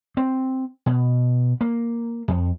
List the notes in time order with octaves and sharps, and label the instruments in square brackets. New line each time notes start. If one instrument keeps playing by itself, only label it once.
[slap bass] C4
B2
A#3
F2